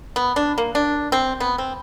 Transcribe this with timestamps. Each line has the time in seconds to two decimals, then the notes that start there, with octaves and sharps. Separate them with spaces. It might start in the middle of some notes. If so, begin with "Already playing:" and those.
0.16 B3
0.36 D4
0.58 A#3
0.75 D4
1.12 C4
1.40 B3
1.58 C4